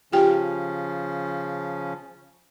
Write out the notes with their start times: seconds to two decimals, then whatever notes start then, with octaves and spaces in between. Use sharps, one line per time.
0.12 C#3 F3 C#4 F4 G4 G5